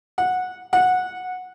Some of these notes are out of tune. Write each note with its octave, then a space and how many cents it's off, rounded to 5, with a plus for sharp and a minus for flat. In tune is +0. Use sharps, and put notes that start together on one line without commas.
F#5 -15
F#5 -15